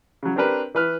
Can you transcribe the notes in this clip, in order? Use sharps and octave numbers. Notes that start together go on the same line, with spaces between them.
C#3 F#3
C4 D4 G4 A#4 B4
E3 B4 F6